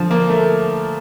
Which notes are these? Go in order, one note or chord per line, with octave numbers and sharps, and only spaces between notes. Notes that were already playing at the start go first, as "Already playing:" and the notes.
Already playing: D3 F3
A#3
A3